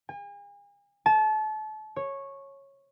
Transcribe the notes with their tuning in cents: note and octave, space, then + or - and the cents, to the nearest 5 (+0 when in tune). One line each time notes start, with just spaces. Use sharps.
G#5 -40
A5 -30
C#5 -10